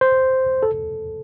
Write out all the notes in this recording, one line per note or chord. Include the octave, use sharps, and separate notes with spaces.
C5
A4